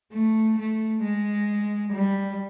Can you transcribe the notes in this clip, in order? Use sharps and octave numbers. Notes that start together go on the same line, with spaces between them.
A3
A3
G#3
G3